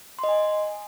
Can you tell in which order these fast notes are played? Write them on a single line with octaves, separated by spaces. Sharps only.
C6 D#5 G#5